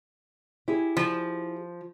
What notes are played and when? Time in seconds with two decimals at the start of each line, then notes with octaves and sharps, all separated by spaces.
0.68 E4 G4 G#4
0.97 F3